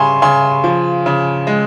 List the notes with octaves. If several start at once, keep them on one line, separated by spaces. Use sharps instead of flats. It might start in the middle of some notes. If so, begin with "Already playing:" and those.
Already playing: C#3 G3 G#5 C6 C#6
C#3 G#5 C6
F3
C#3
G#3